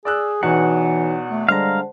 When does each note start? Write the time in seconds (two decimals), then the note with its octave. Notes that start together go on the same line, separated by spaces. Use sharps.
0.05 G#4 D5 E6 F#6
0.43 E2 B2 E3 D#4 F#4 C#5 F#5
1.31 A3
1.49 D3 G3 G#3 C5 F5 F#5 A5 A#5